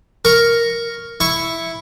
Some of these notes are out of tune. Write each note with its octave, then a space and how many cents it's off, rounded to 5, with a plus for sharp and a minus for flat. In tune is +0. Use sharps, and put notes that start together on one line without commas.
A#4 +0 C#6 +0
E4 +0 C#6 +0